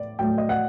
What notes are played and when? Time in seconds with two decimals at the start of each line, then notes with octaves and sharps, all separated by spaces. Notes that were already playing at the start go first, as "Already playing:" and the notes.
Already playing: A2 D5
0.19 A2 F#3 A3 G5
0.38 D#5
0.49 F#5